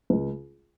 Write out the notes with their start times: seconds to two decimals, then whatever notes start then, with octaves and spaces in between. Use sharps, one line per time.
0.10 C#2